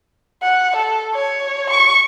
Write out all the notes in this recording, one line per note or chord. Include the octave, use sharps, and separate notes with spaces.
F#5
A4
C#5
C#6